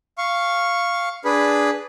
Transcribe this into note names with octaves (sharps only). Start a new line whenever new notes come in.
F5 C#6
D4 G#4 B4 B5